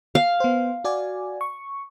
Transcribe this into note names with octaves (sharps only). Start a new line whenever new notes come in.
F5
B3 C5
F#4 D5 G#5
C#6